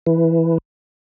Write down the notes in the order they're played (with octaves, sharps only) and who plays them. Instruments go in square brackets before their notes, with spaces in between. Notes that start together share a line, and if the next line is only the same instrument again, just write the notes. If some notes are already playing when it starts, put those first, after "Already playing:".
[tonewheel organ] E3